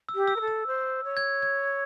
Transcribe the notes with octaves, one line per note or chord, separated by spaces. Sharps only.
E6
G4
E6
A#4
A4
E6
C5
C#5
G#6
G#6